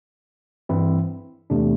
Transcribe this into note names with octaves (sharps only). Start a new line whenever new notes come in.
G2 E3 C4 E4
E2 C3 A3 D4